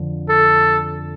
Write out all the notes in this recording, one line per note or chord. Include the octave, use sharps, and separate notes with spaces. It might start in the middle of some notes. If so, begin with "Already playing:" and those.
Already playing: F2 D3 F3
A4